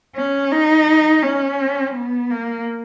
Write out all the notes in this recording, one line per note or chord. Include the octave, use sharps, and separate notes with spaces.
C#4
D#4
C#4
B3
A#3